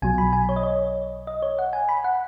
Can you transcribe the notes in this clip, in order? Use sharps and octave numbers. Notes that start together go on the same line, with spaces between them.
B1 B2 F#3 G#5
B5
G#5
C#5
D#5
C#5
D#5
C#5
F#5
G#5
B5
F#5